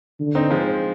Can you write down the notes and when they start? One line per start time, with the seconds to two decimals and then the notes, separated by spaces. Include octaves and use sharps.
0.20 D3
0.35 C4 D#4
0.51 F3 G#3